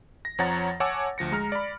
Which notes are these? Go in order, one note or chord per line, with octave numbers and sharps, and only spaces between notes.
A#6
F2 F3 C#5 F#5 A#5 A6
C#5 F#5 G#5 A5 D6 E6
D2 F3 A#6 C#7
G#3 A#5 F6
D5 B5